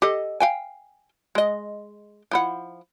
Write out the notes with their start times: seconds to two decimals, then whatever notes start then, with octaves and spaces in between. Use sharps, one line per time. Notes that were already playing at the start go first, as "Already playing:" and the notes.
0.02 G4 A4 D#5
0.40 F5 G5 G#5
1.35 G#3 D#5
2.31 F3 E4 F#5